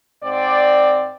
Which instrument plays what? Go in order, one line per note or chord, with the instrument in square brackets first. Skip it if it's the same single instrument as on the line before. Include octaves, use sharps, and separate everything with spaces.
[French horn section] G#2 C4 D5